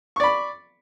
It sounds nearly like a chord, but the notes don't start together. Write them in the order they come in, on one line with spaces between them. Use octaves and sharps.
C#6 D5 B5